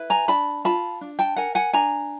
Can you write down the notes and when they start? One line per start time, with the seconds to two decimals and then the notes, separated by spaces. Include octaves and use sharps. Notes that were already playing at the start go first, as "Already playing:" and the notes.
Already playing: E4 B4
0.10 G#5 A#5
0.28 D4 A5 B5
0.65 F4 A5 B5
1.01 D4
1.19 G5 A5
1.36 A#4 F#5 G#5
1.55 F#5 G#5
1.73 D4 G#5 A#5